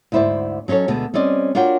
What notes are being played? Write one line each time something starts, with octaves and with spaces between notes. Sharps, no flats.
D2 G#2 E4 C5 D5 E5
F#3 C#4 D#4 A4 C#5
D2 B2 D3 G#3
G3 C4 C#4 D5 D#5
D4 F4 F#4 A#4 C#5 G5